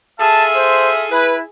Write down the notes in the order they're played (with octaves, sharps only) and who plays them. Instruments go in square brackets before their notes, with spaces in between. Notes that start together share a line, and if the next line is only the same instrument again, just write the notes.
[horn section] F4 A4 E5 [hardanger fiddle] G#4 [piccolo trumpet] A5
[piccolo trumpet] C5
[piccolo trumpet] E4 [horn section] B4